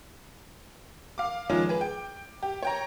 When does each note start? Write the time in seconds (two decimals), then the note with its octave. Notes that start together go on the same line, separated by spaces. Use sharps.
1.18 F5 D6
1.49 D#3 F3 G#3 C#4 F4 G#4
1.69 G#4 B4
1.81 G5
2.43 G4
2.63 C#5 G5 A#5